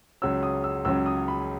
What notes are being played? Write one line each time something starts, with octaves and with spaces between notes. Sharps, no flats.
C#2 C#3 F#3 C#4 E6
D#6
E6
C#2 C#3 F#3 C#4 E6
D#6
B5